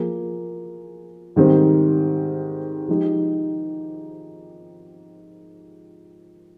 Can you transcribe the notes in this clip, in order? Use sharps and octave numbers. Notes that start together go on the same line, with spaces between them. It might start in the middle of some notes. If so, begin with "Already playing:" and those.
Already playing: F3 A#3 F4 G#4
G#2 D#3 G3 C4
F3 G#3 D#4 G4